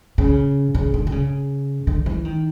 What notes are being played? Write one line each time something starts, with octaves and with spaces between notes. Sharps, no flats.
C#3
C#3
D3
D3
C#3
D3
E3
D#3